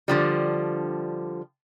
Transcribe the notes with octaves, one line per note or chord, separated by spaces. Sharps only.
D3 F3 G3